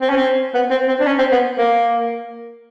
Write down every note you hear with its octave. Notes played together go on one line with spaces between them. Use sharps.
C4
C#4
C4
B3
C4
C4
D4
C#4
C4
B3
A#3